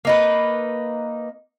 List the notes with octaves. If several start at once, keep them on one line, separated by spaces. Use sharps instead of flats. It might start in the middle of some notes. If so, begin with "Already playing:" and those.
A#3 D#4 B4